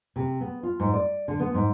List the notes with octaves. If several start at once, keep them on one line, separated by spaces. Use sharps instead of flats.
C3
B3
F4
G#2
D5
D3
B3
G#2